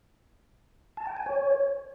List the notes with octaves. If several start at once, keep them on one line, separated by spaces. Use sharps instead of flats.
A5
G5
G#5
C#5